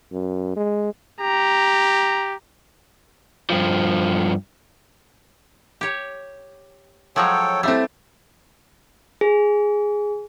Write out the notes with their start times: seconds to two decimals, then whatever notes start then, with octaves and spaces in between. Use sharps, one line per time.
0.12 F#2
0.56 G#3
1.21 G4 A#5
3.50 G2 F3
5.81 G4 C#5
7.16 F3 F#3 G#3 A4 C#5 G5
7.63 G3 A3 C4 E4 E6
9.21 G#4